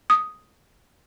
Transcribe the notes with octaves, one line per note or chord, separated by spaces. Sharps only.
D#6